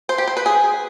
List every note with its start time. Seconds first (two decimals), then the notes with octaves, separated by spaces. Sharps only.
0.09 C5
0.18 G4
0.27 C5
0.37 B4
0.46 G#4